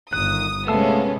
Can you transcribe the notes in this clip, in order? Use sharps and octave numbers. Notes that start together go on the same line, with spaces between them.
G1 D#3 D#6 F#6
C3 G#3 A3 B3 C#4 F5 A5 E6